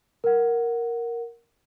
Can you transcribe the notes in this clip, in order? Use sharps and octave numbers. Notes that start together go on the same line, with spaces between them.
A#4 F#5